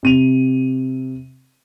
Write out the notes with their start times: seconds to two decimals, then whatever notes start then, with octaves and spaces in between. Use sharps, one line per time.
0.03 C3 D#7 F7